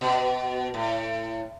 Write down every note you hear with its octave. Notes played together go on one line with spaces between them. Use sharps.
B2
A2